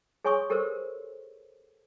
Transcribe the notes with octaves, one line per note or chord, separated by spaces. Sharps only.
G#4 C#5 G#5 C6 C#6 D#6
G4 A4 A#4 C5 E6